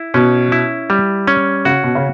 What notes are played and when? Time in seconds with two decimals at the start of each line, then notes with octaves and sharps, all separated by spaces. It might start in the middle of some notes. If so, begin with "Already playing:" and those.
Already playing: E4
0.14 B2 C#4
0.52 E4
0.90 G3
1.27 C#4
1.65 C#3 F#4
1.84 B2
1.95 C#3